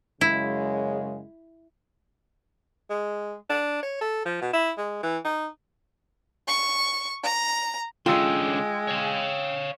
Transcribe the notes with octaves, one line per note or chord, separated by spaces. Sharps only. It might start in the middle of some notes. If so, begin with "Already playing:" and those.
F#2 C#3 G#3 E4
G#3
D4
C#5
A4
F3
B2
E4
G#3
E3
D#4
C#6
A#5
D3 G#3 C#4 F4 G5 E6
C#5 F5